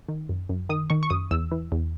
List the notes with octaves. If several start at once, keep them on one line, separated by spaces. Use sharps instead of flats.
D#3
F#2
F#2
D#3 D#6
D#3 C#6
C#6
F#2 D#6
E2 E6
E3
E2